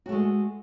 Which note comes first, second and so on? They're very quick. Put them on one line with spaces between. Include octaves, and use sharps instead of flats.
F#4 A3 G#3